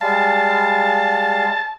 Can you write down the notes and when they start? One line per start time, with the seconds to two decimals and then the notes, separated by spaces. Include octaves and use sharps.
0.01 G3 G#3 F5 A5